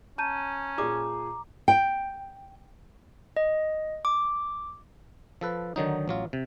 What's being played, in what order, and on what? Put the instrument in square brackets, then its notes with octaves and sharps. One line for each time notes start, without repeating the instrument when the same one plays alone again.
[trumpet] C#4 [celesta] A5 G6 D#7 [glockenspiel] A#5
[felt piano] A#2 G#4 [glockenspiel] A#5 D6
[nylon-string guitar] G5
[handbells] D#5
D6
[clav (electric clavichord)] F3 A4 B4
D3 D#3 F#3 D#4
A1 F#3 F4
C3